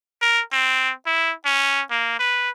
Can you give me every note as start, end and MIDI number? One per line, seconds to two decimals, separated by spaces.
0.21 0.42 70
0.53 0.92 60
1.06 1.33 64
1.45 1.82 61
1.91 2.15 58
2.19 2.50 71